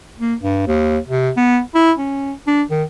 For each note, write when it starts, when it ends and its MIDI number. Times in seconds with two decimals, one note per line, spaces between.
0.20 0.35 58
0.43 0.63 43
0.67 0.98 39
1.08 1.30 48
1.37 1.59 59
1.75 1.92 64
1.98 2.32 61
2.47 2.63 62
2.70 2.83 51